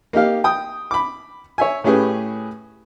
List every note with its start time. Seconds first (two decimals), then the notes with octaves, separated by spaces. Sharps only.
0.13 A#3 D#4 G4 F5
0.44 G5 D#6
0.91 B5 D6
1.58 C#5 E5 G#5
1.84 A2 C#4 G4 G#4 B4